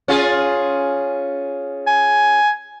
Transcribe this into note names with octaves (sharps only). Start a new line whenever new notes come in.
C#4 F4 G#4
G#5